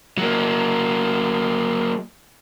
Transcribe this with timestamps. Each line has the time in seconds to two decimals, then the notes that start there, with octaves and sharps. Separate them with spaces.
0.18 F#3 A#3